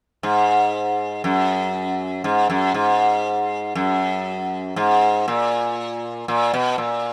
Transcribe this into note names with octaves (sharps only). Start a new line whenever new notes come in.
G#2
F#2
G#2
F#2
G#2
F#2
G#2
A#2
A#2
B2
A#2